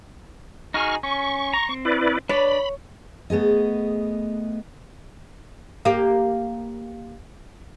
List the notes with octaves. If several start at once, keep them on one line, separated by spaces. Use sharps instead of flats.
D#4 F#4 G#4 C#6 F6
C#4 C#6
A#5
C4
E4 B4 D5
D4 B4 C#5 D5 B5
A3 B3 G#4 D#5
A#3 G4